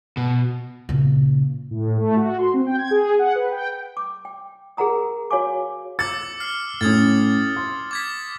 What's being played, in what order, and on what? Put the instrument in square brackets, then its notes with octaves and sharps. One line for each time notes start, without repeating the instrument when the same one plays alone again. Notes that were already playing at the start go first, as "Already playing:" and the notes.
[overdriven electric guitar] B2
[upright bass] A#2 C#3
[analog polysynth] A2
A3
F#4
C6
C4
G5
G#6
G#4
F#5
B4
G5
[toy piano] D6
G5
G#4 A#4 F#5 A#5 D#6
F#4 C#5 F5 G#5 D6
[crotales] D6 E6 C#7 [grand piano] A6
[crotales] F6 C7
[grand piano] A2 C#4 [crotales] D#6 G#6 A6
[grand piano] C6
[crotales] D6 G#6 B6